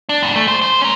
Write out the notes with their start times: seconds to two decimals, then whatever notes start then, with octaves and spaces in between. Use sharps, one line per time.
0.09 D4
0.23 E2 G#2
0.36 A3
0.48 F3 C5
0.62 C5
0.81 C#4 A#4